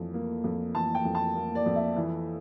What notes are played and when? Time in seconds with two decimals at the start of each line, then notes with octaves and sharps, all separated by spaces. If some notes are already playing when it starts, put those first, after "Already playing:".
Already playing: F2 E3
0.14 A#3
0.44 F2
0.75 E3 A5
0.95 G5
1.05 F2
1.15 A5
1.35 A#3
1.55 D5
1.66 F2
1.76 E5
1.96 E3